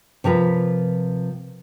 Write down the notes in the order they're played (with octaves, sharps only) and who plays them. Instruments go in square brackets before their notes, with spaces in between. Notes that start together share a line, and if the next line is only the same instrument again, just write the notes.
[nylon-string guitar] C3 F3 A#4 B4